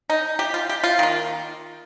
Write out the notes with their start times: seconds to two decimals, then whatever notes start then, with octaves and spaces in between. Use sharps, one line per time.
0.10 D#4
0.39 G4
0.54 F4
0.69 G4
0.84 F4
0.99 D#3 A#3